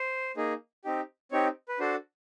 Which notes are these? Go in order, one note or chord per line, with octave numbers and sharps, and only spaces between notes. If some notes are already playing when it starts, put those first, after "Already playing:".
Already playing: C5
A#3 D#4 G#4
C4 D#4 G4
C4 D#4 G4 C#5
B4
D4 F#4 A4 C5